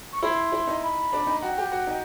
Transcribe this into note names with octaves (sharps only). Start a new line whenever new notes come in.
C#6
E4 C6
E4
D#4
B5
D4
D#4
F#4 G5
G4
F#4
D#4